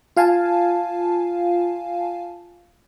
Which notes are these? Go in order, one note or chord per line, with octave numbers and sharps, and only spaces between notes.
F4 F5 G#5 A5